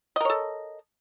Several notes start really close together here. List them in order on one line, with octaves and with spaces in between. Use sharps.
D#5 A#4 C#5 A4